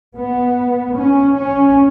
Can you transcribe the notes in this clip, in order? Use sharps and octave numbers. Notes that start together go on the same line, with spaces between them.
B3
C#4
C#4